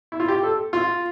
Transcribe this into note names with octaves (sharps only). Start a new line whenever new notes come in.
E4
F4
G4
A4
F4